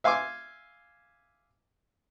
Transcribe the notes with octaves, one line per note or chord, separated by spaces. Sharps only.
E5 F5 G#5 C6 D6